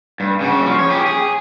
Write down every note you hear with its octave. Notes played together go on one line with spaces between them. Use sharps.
G2
C#3 F#4
F3
C#5
G4 G#4
G#4